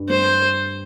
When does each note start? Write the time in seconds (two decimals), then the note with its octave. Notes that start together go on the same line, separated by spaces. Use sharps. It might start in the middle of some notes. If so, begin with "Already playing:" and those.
Already playing: G2
0.09 G3 C5